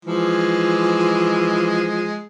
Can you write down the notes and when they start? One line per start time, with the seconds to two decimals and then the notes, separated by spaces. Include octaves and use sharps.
0.05 E3 F3 G#3